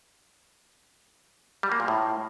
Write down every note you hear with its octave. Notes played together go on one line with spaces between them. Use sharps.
G3
A#3
A#2
A2